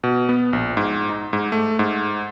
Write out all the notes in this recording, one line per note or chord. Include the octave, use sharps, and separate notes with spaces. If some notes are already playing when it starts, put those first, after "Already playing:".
B2
B3
A#1
G#2
D#4
G#2
A3
G#2